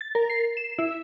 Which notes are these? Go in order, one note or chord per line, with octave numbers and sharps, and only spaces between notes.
A6
A#4
C7
E7
E4